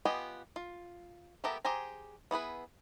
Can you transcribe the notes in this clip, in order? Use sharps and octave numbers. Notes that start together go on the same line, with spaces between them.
B3 F4 G4 D#5 G#5
F4
B3 G4 A4 A#4 E5
G4 G#4 C5 G#5 A#5
B3 E4 G#4 B4